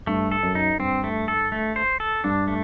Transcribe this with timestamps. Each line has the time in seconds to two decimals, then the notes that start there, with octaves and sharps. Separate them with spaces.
0.07 G2 A3
0.31 A4
0.43 F#2
0.55 D#4
0.79 G2 C4
1.04 A3
1.28 A4
1.52 A3
1.76 C5
2.00 A4
2.24 G2 D4
2.48 A3